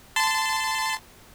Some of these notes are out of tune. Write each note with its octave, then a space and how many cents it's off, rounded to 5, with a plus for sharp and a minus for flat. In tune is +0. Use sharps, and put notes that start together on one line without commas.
A5 +0 C6 -25